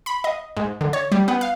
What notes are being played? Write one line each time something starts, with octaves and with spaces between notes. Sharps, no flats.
B5
D#5
G#2
D3
C#5
G3
B3
F5